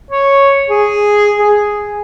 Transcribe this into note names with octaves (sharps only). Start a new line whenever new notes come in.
C#5
G#4
G#4